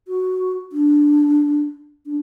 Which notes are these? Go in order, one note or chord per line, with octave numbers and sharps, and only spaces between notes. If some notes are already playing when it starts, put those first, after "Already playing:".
F#4
D4
D4